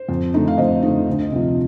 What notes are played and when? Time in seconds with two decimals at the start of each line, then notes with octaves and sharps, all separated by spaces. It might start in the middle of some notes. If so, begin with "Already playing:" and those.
Already playing: C5
0.09 F2
0.34 D3 A3 D#4
0.47 F5
0.58 F2 C5 D#5
0.82 D3 A3 D#4
1.07 D2
1.32 C3 F3